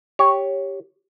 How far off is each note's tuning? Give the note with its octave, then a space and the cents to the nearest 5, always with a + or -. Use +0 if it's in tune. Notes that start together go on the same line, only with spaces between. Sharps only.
G4 +0 C#5 +0